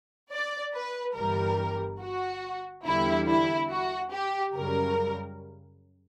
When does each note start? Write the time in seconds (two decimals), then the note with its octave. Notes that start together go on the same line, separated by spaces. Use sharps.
0.31 D5
0.74 B4
1.16 G1 G2 E3 G3 A#4
2.01 F#4
2.86 E2 D3 G3 E4
3.28 E4
3.70 F#4
4.12 G4
4.55 F#2 C#3 G3 A#4